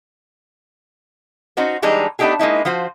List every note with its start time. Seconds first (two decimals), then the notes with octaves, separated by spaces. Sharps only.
1.57 C#4 D#4 F#4 C5
1.82 E3 G3 G#3 D4 D#4
2.19 A3 B3 D4 D#4 G4 G#4
2.39 G#3 A#3 D#4 E4
2.65 F3 F4 F#4 C5